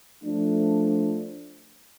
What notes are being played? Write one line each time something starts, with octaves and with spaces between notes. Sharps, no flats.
F3 A3 D4